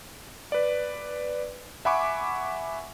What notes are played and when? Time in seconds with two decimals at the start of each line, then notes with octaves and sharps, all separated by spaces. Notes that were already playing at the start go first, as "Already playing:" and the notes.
0.52 B4 D5
1.85 E5 F#5 G#5 B5 C#6 D6